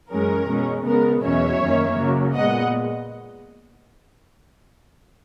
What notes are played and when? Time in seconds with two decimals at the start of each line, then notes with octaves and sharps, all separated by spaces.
0.11 F#2 E3 G#3 C#4 A#4
0.48 B2 G#3 C#4
0.85 C#3 G#3 B3 A#4
1.23 E2 B2 F#3 C#4 C#5 E5
1.60 F#2 D#3 A#3 C#4
1.98 C#3 F#3 A#3
2.35 A#2 G#3 B3 D#5 F#5